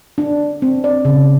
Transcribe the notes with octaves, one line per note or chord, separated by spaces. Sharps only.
D4
C4
D5
C#3